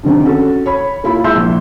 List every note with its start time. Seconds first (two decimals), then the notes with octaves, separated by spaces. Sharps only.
0.03 G2 D3 D#3 C4
0.25 C#4 F#4 A4
0.66 C#5 B5
1.04 A#3 E4 F4 B5
1.24 G#3 E4 E5 C6 E6 G6
1.36 A#1